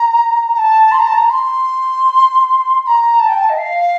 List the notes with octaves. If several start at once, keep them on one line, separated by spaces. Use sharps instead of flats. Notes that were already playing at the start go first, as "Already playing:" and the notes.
Already playing: A#5
A#5
A5
C6
A#5
A5
A#5
C6
C6
A#5
A5
G5
A5
D#5
F5